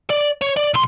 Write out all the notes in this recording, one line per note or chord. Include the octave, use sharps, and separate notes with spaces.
D5
C#5
D5
B1 C6